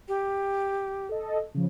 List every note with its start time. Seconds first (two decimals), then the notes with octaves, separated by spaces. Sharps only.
0.08 G4
1.09 A4 D#5
1.54 C#3 F3